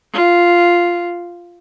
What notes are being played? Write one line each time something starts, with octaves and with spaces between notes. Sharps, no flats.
F4